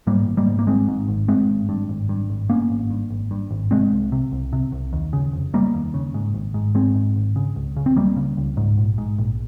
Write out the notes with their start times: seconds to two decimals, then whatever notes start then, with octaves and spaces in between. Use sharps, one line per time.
0.07 G#2 G3 A#3
0.27 G#1
0.37 G3 A#3
0.47 G#2
0.59 A#3
0.67 G#1 G#3 C4
0.88 G#2
1.08 G#1
1.28 G2 G#3 C4
1.49 G#1
1.69 G2
1.89 G#1
2.09 G2
2.30 G#1
2.50 G2 A#3 C#4
2.70 G#1
2.90 G2
3.10 G#1
3.31 G2
3.51 G#1
3.71 C3 G#3 C4
3.92 C2
4.12 C3
4.32 C2
4.53 C3
4.72 C2
4.93 D#2
5.13 C#3
5.33 F1
5.53 F1 G3 A#3
5.74 D#2
5.94 C#3
6.14 G#2
6.34 G#1
6.54 G#2
6.74 G#1 G#3 C4
6.95 G#2
7.16 G#1
7.36 C#3
7.56 C#2
7.76 C#3
7.86 C4
7.96 C#2 G3 A#3
8.17 C#3
8.37 C#2
8.57 G#2
8.78 A#1
8.98 G#2
9.18 A#1